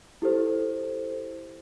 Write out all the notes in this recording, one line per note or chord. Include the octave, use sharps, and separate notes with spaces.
E4 G4 A4 C5